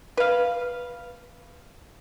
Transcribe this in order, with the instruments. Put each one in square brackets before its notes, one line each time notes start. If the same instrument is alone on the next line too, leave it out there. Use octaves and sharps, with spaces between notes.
[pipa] B4 F5